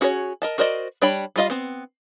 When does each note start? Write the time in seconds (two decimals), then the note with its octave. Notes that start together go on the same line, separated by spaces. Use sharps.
0.01 C#4 F#4 G#4 B4 C#5
0.42 A#4 D#5 A5
0.58 F#4 A#4 C5 D5 D#5
1.02 G3 D4 C#5 G5 B5
1.36 G3 D4 F4 D#5 F5
1.50 B3 C4